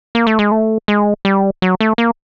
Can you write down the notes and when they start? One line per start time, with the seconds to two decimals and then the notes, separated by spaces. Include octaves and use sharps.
0.15 A#3
0.27 A3
0.39 G#3
0.52 A3
0.88 G#3
1.25 G3
1.62 F#3
1.81 A3
1.98 A#3